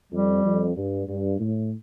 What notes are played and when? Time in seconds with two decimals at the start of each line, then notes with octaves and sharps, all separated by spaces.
0.12 F2 G3
0.44 F2
0.76 G2
1.08 G2
1.39 A2